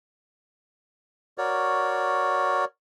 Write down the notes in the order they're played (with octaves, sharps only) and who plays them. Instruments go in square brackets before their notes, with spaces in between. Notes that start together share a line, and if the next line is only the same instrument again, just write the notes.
[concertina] F#4 A#4 C#5 D5